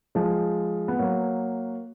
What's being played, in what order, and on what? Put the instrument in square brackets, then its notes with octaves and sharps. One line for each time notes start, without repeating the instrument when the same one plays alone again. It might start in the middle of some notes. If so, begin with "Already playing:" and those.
[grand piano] F3 G#3
B3
F#3 A#3